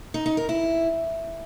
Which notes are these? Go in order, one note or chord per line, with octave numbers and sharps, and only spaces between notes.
D#4
D#4
A#4
E4